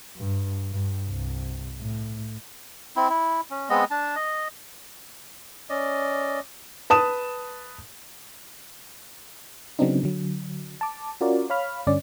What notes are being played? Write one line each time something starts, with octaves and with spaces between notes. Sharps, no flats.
G2
G2
C2
A2
C4 E4
E4
C#4
G#3 B3 C4 D#5
D4 A5
D#5
C#4 D5 D#5
B4 A5 D#6 E7
C#3 F#3 B3 C4 D4 D#4
D3 F#3
A5 D6
C#4 F4 F#4 A#4 D5
C#5 F5 B5 F6
G2 D3 C#4 D5